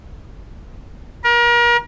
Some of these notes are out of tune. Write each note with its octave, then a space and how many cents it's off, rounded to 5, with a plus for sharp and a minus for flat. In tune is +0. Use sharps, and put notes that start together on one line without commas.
A#4 +35